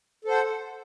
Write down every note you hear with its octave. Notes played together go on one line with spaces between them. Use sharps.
A4 C5 F#5